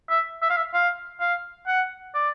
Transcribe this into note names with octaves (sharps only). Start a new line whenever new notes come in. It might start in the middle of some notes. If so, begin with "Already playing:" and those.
E5
E5
F5
E5
F5
F5
F#5
D5